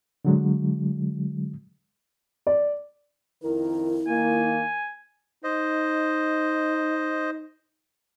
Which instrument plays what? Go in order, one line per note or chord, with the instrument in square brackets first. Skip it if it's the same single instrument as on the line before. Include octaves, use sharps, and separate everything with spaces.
[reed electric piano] D3 F#3 G#3
[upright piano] D5
[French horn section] F2 D#3 A#4 [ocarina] E4
[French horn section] D#3 A#3 [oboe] G#5
[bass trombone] D#4 [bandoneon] C5 D#5